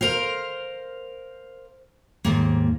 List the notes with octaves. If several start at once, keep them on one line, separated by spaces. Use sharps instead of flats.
A#4 C5 F5
D#2 G#2 A#3